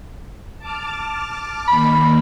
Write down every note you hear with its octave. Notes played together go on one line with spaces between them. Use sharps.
A5 D6 F6
D#3 A#3 B5